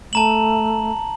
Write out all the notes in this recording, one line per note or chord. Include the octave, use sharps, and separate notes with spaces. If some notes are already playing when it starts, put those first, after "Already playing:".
A3 A5 A#5 F#7